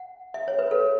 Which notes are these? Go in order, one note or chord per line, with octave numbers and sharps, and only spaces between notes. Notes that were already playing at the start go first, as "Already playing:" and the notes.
Already playing: F#5
E5
C#5
B4
A4